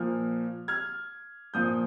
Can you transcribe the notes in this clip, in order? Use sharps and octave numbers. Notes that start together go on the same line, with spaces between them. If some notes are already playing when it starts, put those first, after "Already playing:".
Already playing: A#2 F3 F6
F6 G#6
A#2 F3 D#6 G6